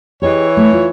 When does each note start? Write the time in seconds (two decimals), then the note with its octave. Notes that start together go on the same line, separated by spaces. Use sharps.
0.22 E3 G4 G#4 C#5 D#5
0.57 A3
0.73 F4